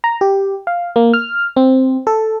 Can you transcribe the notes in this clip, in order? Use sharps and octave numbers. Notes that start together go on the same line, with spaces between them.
A#5
G4
F5
A#3
F6
C4
A4